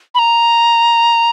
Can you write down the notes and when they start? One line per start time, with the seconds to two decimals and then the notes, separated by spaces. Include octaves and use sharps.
0.15 B5
0.19 A#5